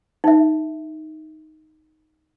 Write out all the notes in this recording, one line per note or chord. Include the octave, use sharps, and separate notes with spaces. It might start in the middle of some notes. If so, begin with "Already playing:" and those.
D#4 E5